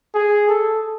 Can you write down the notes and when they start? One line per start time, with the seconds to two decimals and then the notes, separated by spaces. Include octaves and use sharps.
0.14 G#4
0.49 A4